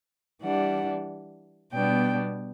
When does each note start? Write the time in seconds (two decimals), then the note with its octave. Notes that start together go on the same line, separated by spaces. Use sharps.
0.41 E3 G3 D4 F#5
1.72 B2 G3 B3 D4 G5